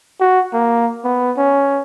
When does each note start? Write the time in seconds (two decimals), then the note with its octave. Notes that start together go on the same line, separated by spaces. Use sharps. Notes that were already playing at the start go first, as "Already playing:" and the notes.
0.21 F#4
0.53 A#3
1.05 B3
1.37 C#4